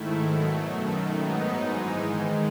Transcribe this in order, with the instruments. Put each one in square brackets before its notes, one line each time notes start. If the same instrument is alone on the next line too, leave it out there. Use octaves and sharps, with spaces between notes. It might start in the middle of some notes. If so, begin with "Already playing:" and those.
Already playing: [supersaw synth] G#2 D#3 A3 E4
B2 F#3 A3
F#2 D#3 A3
G#2 F#3 B3 D#4
G#2 E3 G#3 D#4
G#2 D#3 G#3